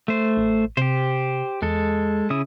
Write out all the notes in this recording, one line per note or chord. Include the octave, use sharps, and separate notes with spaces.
A3 C5
A1
C3 G4 C5
E2 G#3 A4
C#3 E4 D#6